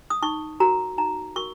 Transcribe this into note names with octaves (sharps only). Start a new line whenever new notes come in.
D#6
D#4 C#6
F#4 A#4 A#5
D#4 A#5
F#4 A#4 C#6